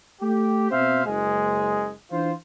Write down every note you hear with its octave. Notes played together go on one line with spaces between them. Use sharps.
A3 G4
B2 C4 C5 E5 F5
F#1 G#3
E3 D4 F4 C5